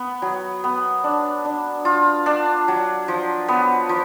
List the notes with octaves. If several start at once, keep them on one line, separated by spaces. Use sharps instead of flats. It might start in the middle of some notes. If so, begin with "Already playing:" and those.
Already playing: B3
F#3
B3
D4
D4
F4
D4
F#3
F3
B3
F3